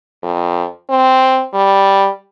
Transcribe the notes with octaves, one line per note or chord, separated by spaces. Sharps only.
F2
C4
G3